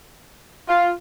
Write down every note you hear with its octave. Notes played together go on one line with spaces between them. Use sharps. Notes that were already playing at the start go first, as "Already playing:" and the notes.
F4